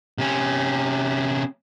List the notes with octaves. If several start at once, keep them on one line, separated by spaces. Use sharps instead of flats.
C3 C#4